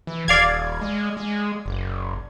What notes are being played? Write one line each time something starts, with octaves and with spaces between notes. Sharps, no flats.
E3
D#1 D5 F5 G#6
G#3
G#3
F#1